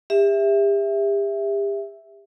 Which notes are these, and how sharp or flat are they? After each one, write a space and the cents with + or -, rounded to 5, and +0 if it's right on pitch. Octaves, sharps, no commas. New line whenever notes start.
G4 +40 E5 +0